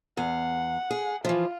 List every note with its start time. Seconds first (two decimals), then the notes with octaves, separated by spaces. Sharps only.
0.17 E2 F5 F#5
0.91 G#4
1.25 E3 F3 F4